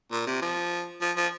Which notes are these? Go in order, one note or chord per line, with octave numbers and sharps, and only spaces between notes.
A#2
C3
F3
F3
F3